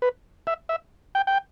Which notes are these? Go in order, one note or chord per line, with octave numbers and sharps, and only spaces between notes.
B4
E5
E5
G5
G5